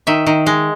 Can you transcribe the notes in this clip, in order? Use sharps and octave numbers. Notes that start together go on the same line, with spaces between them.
D#3 E5
D#3
G#3